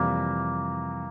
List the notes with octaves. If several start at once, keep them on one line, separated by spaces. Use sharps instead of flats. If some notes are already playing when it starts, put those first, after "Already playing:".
Already playing: F2 C3 E3 G3 A#3